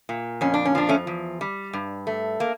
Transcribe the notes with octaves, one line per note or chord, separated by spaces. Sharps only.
A#2
F2 C#4
D4
C#4
F3 D4
A3 C#4
E2
G3
G2
A3
A#3